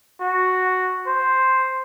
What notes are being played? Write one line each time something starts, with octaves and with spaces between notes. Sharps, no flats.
F#4
C5